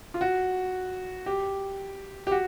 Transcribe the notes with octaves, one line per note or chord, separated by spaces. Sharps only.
F4
F#4
G4
G4
F#4